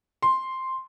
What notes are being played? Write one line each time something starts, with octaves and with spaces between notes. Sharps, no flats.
C6